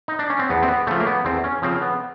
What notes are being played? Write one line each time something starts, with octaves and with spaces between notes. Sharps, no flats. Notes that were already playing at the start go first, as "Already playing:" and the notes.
D#4
D4
C#4
C4
E2 B3
C4
B3
C#3 F3 A3
A#3
B3
E2 C4
C#4
C#3 F3 C4
B3